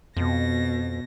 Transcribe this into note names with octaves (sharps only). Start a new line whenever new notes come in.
F2 B2 A#6